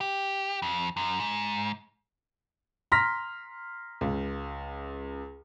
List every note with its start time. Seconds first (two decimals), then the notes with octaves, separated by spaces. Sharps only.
0.01 G4
0.62 F2
0.97 F#2
1.20 G#2
2.92 A#5 C6 F6 A#6 B6
4.01 C#2